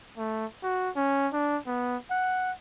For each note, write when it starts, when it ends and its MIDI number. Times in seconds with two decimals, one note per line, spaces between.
0.17 0.46 57
0.63 0.90 66
0.96 1.28 61
1.33 1.58 62
1.66 1.96 59
2.11 2.52 78